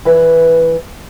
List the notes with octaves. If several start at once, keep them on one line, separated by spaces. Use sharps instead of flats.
E3 B4 E5